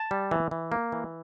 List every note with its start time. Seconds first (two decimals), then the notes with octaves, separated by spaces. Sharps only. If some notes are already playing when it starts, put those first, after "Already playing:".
Already playing: A5
0.11 G3
0.31 E3
0.51 E3
0.72 A#3
0.92 E3